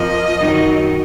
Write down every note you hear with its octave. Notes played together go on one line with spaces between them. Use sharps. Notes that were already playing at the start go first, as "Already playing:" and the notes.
Already playing: F2 F3 A#3 D#5
F#2 D#3 F#3